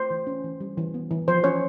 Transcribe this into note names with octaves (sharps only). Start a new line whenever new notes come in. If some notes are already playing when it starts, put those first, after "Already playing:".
Already playing: A3 C5
E3
C#4
E3
G3
E3
B3
E3
F3 C5
C#4 C#5